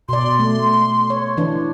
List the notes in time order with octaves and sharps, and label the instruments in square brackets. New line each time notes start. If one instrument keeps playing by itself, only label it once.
[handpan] B2 D5 [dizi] C6
[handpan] A3
C#5
E3 D4